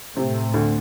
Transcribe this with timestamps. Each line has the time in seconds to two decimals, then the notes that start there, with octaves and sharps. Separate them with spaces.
0.17 A2 C3 A3 C4
0.54 D2 D3